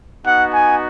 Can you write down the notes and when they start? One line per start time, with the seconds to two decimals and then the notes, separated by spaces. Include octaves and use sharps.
0.24 B3 D#4 F#4 F#5
0.53 G#5